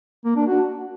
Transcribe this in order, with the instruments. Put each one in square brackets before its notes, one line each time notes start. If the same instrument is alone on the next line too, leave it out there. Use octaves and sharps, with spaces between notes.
[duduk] A#3
D4
F#4